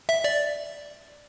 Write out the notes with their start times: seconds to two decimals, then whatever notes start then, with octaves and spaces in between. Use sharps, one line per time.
0.09 E5
0.24 D5